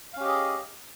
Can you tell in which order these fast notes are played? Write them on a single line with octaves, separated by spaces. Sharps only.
F5 C#4 G4 D#5 G#4